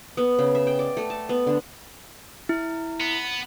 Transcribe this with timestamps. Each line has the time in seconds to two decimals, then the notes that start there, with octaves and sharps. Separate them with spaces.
0.17 B3
0.39 C#3
0.55 E5
0.67 G5
0.79 D5
0.97 A3
1.10 A5
1.29 B3
1.47 D3
2.49 E4
3.00 B3